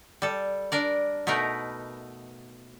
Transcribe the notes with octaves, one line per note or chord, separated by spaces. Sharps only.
G3 A4
D4 A#4 D5
B2 A3 D#4 A#4 B4